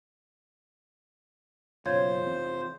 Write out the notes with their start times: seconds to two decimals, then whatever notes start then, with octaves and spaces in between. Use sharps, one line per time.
1.86 F#1 F#2 B2 F4 C5 C#5 G#6
2.26 F1 E3 C4